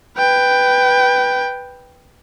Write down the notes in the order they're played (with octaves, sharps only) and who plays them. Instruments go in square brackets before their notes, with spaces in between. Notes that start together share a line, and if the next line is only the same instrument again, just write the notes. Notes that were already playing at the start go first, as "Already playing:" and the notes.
[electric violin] B4 G5